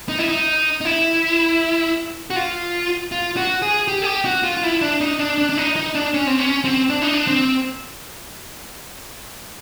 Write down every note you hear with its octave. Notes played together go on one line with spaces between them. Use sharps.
D#4
E4
D#4
D#4
E4
F#4
F4
F4
F#4
G#4
G4
G#4
G4
F#4
F4
F4
E4
D4
D#4
D4
D4
D4
D#4
D#4
D4
C#4
C4
C#4
C4
D4
D#4
D4
C4